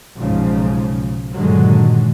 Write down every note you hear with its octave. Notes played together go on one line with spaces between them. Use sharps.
B1 G#2 C#3 F3
G2 A#2 D3 D#3 F#3 G#3